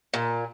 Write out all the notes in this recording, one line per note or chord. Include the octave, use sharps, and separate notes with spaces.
A#2